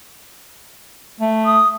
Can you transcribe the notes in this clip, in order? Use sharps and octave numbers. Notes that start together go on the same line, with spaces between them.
A3
D#6